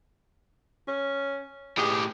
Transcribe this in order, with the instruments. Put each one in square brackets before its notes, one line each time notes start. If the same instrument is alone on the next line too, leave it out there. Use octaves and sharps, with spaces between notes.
[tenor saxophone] C#4
[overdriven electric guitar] A2 G4 [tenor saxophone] G#4